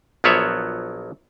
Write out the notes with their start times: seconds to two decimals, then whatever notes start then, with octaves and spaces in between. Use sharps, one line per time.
0.24 A#1 F3 F#3 B3 C#5 E5